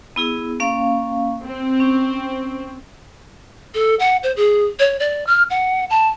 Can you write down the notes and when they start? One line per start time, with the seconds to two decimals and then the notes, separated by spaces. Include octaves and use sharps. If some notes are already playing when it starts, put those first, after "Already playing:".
0.16 B3 E4 G#4
0.60 A#3 C#4 F5
1.44 C4
1.80 C#4
3.74 A4
3.99 F#5
4.23 C5
4.37 G#4
4.79 C#5
5.00 D5
5.27 F6
5.50 F#5
5.90 A5